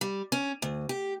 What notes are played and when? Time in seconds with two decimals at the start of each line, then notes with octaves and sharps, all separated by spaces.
0.01 G3
0.32 C#4
0.62 D2
0.89 G4